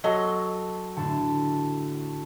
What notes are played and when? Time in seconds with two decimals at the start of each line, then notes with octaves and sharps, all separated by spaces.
0.04 F#3 F#4 A4 D#5 C6
0.97 A2 D3 A5